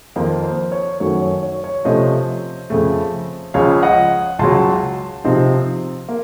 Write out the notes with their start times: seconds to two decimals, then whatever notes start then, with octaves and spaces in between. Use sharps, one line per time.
0.16 F2 D#3 A#3 D#4 C5
0.44 C5
0.72 C#5
1.00 F#2 D#3 F#3 A3 C#5
1.22 C#5
1.43 C#5
1.64 C#5
1.85 C3 F3 A3 C#4 C5 D#5
2.70 F2 C#3 A3
3.54 C#2 C#3 F3 C#5 F5
3.83 D#5 F#5
4.39 C#2 C#3 F#3 A5 C6
5.24 C3 F3 C4 D#4
6.09 A#3